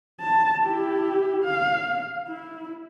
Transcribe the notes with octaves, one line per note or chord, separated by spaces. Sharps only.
A5
E4 G4
F5
E4